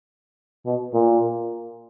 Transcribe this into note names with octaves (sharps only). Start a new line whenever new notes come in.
B2
A#2